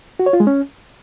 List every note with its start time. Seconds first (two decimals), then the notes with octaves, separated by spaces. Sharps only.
0.19 F#4
0.26 C#5
0.33 F4
0.40 G#3
0.47 C#4